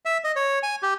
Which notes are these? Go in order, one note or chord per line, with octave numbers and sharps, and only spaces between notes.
E5
D#5
C#5
G#5
G4